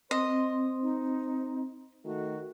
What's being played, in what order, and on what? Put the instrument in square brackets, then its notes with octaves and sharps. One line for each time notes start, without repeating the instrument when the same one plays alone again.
[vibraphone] C4 [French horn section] C5 [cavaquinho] D#5 [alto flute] C6
[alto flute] D#4
[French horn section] D#3 A3 [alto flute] F#4